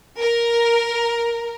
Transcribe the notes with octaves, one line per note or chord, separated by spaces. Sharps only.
A#4